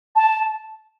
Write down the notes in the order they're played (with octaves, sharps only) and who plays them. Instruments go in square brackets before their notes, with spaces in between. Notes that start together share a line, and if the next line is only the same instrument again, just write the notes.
[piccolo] A5